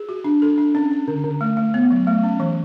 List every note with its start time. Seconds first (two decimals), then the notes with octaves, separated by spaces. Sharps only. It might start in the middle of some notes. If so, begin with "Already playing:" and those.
Already playing: G#4
0.09 F#4
0.24 D4
0.42 A4
0.58 D4
0.75 C#4
0.91 C#4
1.08 D3
1.24 D3
1.41 A3
1.57 A3
1.74 B3
1.91 F#3
2.07 A3
2.23 C#4
2.40 E3